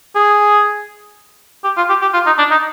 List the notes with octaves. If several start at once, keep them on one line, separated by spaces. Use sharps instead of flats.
G#4
G4
F4
G4
G4
F4
D#4
D4
D#4